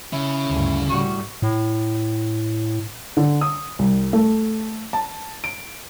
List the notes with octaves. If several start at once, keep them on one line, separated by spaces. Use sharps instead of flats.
C#3 E4
D2 G2
A2 G3 F#4
A2
D3
D#6
C2
A3
A5
D7